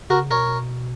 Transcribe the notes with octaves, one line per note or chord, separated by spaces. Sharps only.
C#3 F#4 A#4
B2 A#4 C#5